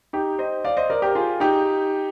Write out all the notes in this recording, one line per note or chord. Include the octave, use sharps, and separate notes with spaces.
D#4 G4
C5 D#5
D5 F5
C5 D#5
A#4 D5
G4 A#4
F4 G#4
D#4 G4